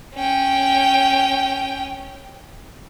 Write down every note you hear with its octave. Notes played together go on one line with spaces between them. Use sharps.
C#4 G5